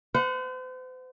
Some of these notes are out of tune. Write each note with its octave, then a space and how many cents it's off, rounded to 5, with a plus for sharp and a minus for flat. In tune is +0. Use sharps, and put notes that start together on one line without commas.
C5 -40 F#5 -15